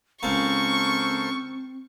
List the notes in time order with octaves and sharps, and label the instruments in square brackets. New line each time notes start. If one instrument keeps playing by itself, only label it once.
[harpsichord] C#2 A#3 [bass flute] C4 [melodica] A4 A#4 C5 [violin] C#6